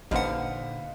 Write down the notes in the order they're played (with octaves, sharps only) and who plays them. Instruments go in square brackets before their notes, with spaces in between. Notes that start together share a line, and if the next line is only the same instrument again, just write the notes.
[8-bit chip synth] A1 F#5 [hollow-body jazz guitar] A#2 D3 [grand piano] D#4 B4 C5 [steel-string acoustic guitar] F5